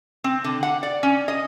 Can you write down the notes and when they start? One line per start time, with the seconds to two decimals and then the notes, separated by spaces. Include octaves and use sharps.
0.24 C4
0.44 D3
0.63 F#5
0.83 D5
1.03 C#4
1.28 D#5